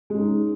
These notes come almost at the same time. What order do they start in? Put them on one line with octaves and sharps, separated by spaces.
G#3 C#4 D#4